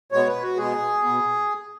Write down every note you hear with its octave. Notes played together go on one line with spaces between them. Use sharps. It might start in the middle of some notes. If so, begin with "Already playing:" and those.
B2 G#3 B3 C#5
B4
F#4
B2 G#3 B3 G#4
B2 B3